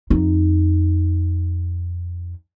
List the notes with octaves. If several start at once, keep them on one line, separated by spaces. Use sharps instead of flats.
F2 D#4